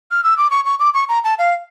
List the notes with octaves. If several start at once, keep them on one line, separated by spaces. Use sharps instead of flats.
F6
E6
D6
C#6
C#6
D6
C#6
A#5
A5
F5